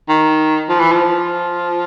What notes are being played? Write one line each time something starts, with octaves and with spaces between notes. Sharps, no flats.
D#3
F3
E3
F3